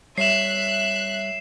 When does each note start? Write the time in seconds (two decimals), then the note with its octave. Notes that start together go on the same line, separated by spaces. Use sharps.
0.18 G3 C#5 E5 F#6 C7 E7